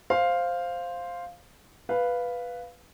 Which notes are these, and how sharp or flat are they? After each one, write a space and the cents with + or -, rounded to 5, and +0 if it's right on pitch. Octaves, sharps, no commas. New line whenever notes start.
C5 +0 F5 +0
B4 +0 F5 +0